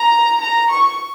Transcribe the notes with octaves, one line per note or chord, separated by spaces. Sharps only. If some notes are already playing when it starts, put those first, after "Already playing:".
Already playing: A#5
A#5
C#6